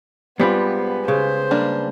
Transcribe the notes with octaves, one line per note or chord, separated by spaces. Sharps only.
G3 G#3 B3 C4 F4 B4 C5
C#3 C5
G3 A#3 D4